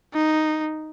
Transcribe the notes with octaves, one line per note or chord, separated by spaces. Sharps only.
D#4